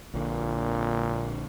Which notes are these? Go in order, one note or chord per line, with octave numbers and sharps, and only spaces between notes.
A#1 A#2 D3